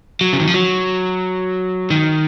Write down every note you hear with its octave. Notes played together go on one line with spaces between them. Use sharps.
F#3
C#3
D#3
F3
F#3
D#3